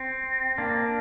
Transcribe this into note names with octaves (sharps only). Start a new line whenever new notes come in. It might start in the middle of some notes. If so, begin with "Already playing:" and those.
Already playing: C4
A#3 D4